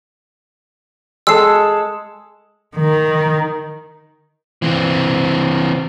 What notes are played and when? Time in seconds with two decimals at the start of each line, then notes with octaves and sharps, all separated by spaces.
1.27 G#3 A4 E6 C7
2.76 D#3
4.62 E3 C4